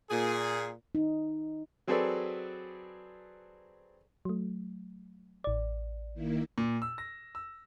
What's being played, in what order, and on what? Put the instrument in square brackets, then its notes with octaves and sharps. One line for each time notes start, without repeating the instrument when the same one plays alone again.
[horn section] A#2 G#4
[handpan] D#4
[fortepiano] F#3 C4 G#4 A4 B4 D5
[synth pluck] F#3 A3
A1 D5
[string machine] D#3 A#3 E4
[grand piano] A#2
E6
A#6
E6